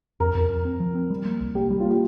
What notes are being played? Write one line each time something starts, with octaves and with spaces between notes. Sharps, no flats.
F2 A#4
F2
F2
C4
F3
C4
G3
A#3
C2
A#3 G4
G3
A#3 F4
G4